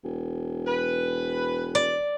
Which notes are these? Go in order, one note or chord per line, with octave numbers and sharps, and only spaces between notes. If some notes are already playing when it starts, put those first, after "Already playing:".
E1
B4
D5